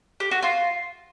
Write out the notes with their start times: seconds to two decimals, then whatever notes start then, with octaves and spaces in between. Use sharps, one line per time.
0.20 G4
0.31 F#4
0.43 F4